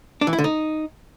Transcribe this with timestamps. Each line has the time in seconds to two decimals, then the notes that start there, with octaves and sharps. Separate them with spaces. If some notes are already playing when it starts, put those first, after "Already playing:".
0.21 D4
0.27 E3
0.33 E4
0.39 D3
0.44 D#4